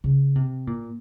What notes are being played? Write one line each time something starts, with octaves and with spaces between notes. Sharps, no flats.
C#3
C3
A#2